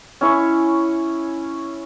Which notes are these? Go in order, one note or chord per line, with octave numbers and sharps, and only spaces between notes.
C#4 E4 C#6